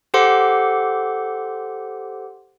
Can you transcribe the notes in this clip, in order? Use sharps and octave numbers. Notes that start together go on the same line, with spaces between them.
G4 A4 C5 F#5 C6 D6